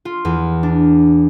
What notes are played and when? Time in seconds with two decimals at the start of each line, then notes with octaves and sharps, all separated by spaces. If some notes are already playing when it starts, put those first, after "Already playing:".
0.05 F4
0.25 E2
0.63 D4